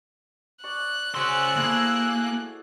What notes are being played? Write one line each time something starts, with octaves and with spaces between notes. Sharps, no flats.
D5 C#6 F#6
C#3 F#4 G#4 C5 C6 E6
A#3 E4 G#4 A4